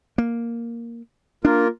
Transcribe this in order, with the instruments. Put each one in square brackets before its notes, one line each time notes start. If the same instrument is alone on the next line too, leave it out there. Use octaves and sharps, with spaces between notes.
[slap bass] A#3
[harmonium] A#3 F4 A#4 [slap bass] D4